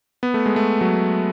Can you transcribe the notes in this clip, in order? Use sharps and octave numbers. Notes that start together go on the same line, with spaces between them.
B3
A3
G#3
A3
F#3